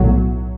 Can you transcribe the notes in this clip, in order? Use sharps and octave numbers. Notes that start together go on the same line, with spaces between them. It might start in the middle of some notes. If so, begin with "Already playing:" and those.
Already playing: B1 A2 F#3